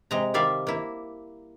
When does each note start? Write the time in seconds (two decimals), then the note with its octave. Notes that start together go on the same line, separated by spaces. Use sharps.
0.11 C3 G#3 A#5
0.34 D#3 G3 D5 E5 F5
0.67 A#3 E4